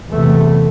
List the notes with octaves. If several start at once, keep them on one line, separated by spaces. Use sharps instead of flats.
E2 C3 A3